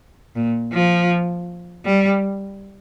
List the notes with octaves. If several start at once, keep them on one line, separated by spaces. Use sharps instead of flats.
A#2
F3
G3